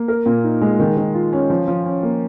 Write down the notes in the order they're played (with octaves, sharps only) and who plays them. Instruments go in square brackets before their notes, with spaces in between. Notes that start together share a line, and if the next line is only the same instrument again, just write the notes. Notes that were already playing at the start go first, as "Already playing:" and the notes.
Already playing: [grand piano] A#3
A#4
A#2
D#4
G#3
D#3
D#3
F4
C#4
F3
F3
C#4
A#3